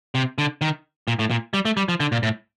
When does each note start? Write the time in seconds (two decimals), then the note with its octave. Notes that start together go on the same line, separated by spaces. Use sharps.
0.15 C3
0.38 D3
0.61 D#3
1.08 A#2
1.19 A2
1.30 A#2
1.54 G3
1.65 A3
1.77 G3
1.89 F3
2.00 D3
2.12 A#2
2.23 A2